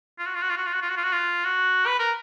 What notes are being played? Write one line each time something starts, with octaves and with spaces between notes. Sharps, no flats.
F4
F#4
F4
F#4
F4
F#4
F4
F#4
F4
F#4
F4
F#4
F4
F#4
B4
A#4